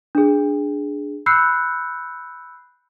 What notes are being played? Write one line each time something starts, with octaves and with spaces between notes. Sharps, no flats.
D4 G#4
B5 E6 F#6 G6 C7 C#7